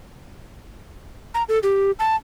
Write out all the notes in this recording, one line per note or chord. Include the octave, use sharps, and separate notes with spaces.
A#5
A4
G4
A5